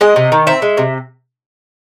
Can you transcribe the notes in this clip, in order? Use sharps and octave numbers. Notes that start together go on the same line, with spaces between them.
G#3 D#5
C3
D#3
C4 E5
G#3
C3